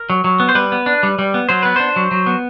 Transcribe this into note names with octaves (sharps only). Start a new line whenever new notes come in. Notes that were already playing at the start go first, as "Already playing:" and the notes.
Already playing: A#4
F#3
F#3
B3
C5
G3 B4
B3
D4
G3
G3
B3
F#3 C5
B3 B4
D4 C5
F#3
F#3
B3